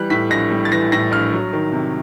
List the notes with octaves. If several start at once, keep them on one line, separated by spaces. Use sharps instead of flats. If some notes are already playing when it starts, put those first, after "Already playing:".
Already playing: E3 G3 F#6
A2 B6
A#1 A#6
G3
A6
E3 A#6
A2 A#6
A#1 F6
F#3
D#3
C3